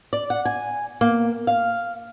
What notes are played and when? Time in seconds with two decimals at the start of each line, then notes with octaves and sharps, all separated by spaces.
0.13 D5
0.30 F#5
0.45 G#5
1.01 A#3
1.47 F5